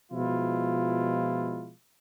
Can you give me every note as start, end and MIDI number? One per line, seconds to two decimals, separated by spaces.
0.12 1.72 47
0.12 1.72 53
0.12 1.72 56
0.12 1.72 64
0.12 1.72 65